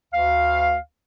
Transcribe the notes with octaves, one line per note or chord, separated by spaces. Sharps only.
D2 F5